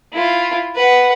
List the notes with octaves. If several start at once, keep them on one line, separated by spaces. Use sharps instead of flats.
E4 F4
B4 F#5